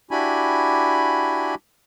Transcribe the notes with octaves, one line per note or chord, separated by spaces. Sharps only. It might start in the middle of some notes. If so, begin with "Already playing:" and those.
D4 E4 F#4 G4 G#5 B5